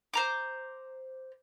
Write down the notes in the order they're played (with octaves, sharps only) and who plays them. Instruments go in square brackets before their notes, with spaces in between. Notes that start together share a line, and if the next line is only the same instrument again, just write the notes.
[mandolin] C5 A#5 D6